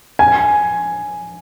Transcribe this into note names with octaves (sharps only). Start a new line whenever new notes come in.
G#5